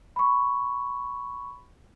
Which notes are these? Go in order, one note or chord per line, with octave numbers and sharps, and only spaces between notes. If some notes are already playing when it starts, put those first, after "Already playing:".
B5 C#6